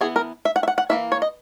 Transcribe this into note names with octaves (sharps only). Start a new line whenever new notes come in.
E3 B3 E4 G#4
A#4
E5
F#5
E5
F#5
F#5
E3 A#3 E4 E5
C#5
D#5